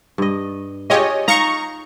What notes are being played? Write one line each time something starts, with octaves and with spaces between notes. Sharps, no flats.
G2 D#5
F4 G4 G#4 C#5 D#5
D#4 F5 A#5 C#6